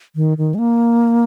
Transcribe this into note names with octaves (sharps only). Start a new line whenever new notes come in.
D#3
D#3
G#3
A#3